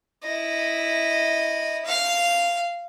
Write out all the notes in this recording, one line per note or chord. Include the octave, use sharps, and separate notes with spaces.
E4 D#5
F5